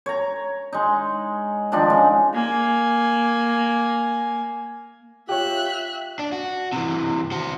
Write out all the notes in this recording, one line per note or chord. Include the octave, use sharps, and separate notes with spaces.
C#5 A#5
G#3 D#4
D#3 F3 D4 D#4
G#3 C#4
A#3 G#5
F4 G4 C#5 E5 F#6
D4
F#4
C3 E3
F#4 C5